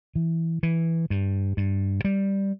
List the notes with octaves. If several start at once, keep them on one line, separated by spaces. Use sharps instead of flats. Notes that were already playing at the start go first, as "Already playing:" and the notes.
E3
E3
G2
G2
G3